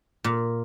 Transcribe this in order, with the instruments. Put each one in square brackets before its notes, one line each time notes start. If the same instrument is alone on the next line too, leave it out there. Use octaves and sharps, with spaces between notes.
[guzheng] A#2